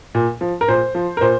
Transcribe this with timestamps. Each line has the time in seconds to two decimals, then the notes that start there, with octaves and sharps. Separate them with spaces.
0.15 A#2
0.41 F3
0.61 A#4
0.68 A#2 C5
0.95 F3
1.17 A#4
1.21 A#2 C5